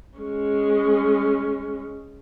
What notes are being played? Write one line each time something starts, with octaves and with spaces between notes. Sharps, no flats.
G#3 C#4